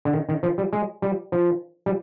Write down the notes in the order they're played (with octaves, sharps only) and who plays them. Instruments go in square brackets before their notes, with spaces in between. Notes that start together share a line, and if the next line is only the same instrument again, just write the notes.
[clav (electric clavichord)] D3
D#3
D#3
F3
G3
G#3
G3
F3
G3